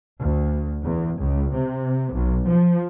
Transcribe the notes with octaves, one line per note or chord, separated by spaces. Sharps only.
D2
E2
C#2
C3
B1
F3